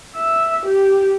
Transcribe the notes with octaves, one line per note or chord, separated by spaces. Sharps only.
E5
G4